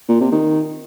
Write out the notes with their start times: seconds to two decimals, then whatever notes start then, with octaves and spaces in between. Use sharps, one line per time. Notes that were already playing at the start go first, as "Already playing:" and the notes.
0.09 A#2
0.20 C3
0.32 D#3